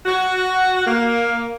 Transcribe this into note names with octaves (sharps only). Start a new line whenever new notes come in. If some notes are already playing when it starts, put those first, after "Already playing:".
F#4
A#3